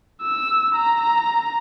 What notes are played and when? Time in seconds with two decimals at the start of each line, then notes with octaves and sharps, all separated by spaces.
0.22 E6
0.75 A#5